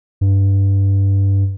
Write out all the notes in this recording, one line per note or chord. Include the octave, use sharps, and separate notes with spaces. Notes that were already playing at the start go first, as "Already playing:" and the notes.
G2